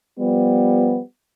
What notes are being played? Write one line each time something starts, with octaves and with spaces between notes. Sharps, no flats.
F3 G3 B3